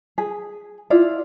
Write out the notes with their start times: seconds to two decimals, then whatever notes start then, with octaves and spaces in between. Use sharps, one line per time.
0.18 G#4
0.90 E4 F4 D5